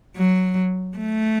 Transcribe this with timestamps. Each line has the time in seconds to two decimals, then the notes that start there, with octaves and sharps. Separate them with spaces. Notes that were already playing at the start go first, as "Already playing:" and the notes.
0.16 F#3
0.97 A3